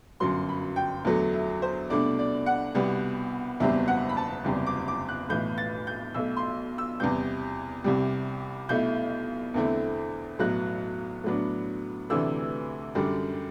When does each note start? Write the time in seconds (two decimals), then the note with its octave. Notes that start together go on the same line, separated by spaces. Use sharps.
0.20 G1 F#2 F#3 C6
0.49 B5
0.76 G5
1.05 E2 D3 F#3 A3
1.33 E5
1.62 C5
1.90 C2 B2 A3 D4 D5
2.19 D5
2.46 F#5
2.74 C2 B2 G3 B3
3.60 F#1 E2 B2 G3 C4 E5
3.88 F#5
4.09 B5
4.17 A5
4.45 F#1 E2 C3 G3
4.67 D6
4.88 D6
5.08 F#6
5.29 B1 A2 E3 G6
5.58 A6
5.87 G6
6.14 B1 B2 A3 E6
6.37 C6
6.78 E6
7.00 E2 C3 G3 B3 G6
7.84 C2 C3 G3
8.69 B1 B2 A3 E4 G6
9.54 E2 D3 A3 C4 E4
10.39 B1 A2 F#3 B3 F#6
11.24 A2 F#3 B3 D4
12.10 D2 C3 E3 A3 D4 E6
12.95 F#2 D3 G3 D4